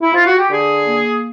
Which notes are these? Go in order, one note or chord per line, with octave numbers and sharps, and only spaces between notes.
E4
F4
F#4
G4
D3 G#4
A#3